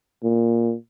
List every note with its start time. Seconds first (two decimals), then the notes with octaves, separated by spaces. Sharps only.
0.24 A#2